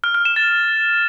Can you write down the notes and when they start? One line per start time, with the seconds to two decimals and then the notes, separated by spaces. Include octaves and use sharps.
0.04 F6
0.15 F6
0.25 E7
0.36 A6